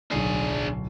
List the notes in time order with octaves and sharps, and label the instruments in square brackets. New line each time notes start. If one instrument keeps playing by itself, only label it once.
[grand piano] D1 B1 C7 [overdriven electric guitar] D4 G#4